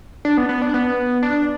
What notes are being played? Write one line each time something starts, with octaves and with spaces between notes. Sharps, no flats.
D4
B3
B3
D4
B3
D4